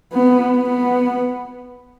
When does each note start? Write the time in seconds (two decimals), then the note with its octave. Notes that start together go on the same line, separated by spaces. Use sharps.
0.13 B3
0.58 B3